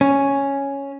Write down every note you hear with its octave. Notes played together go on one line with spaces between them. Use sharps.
C#4